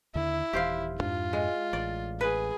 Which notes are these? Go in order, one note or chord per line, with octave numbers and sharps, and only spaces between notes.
D#2 D3 E4
D#1 E3 G4 C5 F5
F2 G#2 D4 F4
G#3
A1 D5
G#4 B4